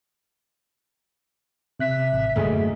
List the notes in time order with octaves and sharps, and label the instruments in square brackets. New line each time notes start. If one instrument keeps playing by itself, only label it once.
[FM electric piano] C3 F#6 B6 [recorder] E5
[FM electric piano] A1
[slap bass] G1 F#2 A#3 [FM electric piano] A3 G#4 D#5